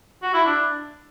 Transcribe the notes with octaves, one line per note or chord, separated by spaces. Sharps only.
F#4
E4
D4